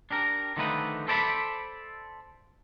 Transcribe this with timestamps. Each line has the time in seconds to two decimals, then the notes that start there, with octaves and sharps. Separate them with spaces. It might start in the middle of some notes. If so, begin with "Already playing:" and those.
0.11 D4 G4 A#4
0.57 D3 D#3 F3 A3 D#4 B4
1.08 A4 C5 D5 E5 A5 B5